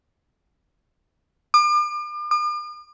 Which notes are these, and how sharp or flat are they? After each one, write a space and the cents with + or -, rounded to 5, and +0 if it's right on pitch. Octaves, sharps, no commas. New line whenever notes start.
D6 +40
D6 +45